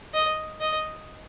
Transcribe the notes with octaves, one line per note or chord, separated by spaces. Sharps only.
D#5
D#5